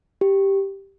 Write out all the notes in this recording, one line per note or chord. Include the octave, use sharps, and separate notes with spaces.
G4